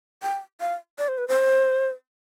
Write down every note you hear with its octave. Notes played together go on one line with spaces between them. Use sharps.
G5
F5
D5
C5
B4
C5